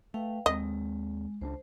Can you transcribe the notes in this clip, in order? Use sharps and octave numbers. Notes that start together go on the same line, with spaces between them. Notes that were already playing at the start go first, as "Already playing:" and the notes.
A3 B4 F5 G5
D#2 G#3 C4 D#5
C#2 C#4 D4 C5